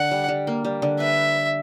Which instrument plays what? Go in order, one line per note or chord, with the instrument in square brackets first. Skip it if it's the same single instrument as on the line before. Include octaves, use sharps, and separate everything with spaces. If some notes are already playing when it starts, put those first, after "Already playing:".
Already playing: [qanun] D3 [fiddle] F#5
[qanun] G3
G3
A#3
G3
D3
[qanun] B4 [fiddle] E5